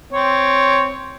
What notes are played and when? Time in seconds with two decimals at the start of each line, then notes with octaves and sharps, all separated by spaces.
0.13 C4 C#5